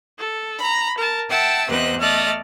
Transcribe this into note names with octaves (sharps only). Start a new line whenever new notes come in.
A4
A#5 B5
A#4 A5
E5 F#5 G5 A5 E6
E2 C3 B4 C5 D#5 F#6
A3 D5 D#5 F6 F#6